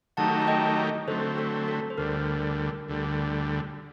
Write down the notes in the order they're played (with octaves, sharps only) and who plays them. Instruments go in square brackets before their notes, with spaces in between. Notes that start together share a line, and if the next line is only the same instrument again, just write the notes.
[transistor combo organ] D#3 F#3 A3 D#4 G4 [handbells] F#5 A5
[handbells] A5
D#5 G5
[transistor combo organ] D3 F#3 A3 C4 [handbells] A4 C5
[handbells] A4
A4
C5
[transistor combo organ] D2 D3 G3 [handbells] A#4
[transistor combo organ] D2 D3 G3